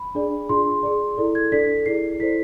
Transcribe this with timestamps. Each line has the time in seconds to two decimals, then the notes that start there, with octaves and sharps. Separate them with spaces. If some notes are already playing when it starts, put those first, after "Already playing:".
Already playing: B5
0.15 D4 G#4 D5
0.49 D4 F4 G#4 C6
0.83 G#4 D5
1.17 E4 A4 D5
1.35 G#6
1.52 D4 A4 D5 B6
1.86 E4 G#4 D5 C7
2.20 E4 A4 C5 B6